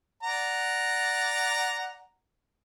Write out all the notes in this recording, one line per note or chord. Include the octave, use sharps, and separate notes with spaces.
D5 F#5 A#5